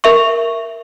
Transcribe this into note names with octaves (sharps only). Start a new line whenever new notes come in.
A#4 E5 C#6